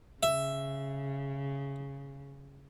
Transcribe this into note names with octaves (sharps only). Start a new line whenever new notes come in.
C#3 E5